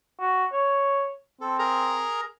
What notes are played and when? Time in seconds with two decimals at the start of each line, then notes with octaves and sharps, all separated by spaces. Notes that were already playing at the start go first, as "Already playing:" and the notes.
0.20 F#4
0.52 C#5
1.41 C4 A4
1.59 G#4 A#4 A#5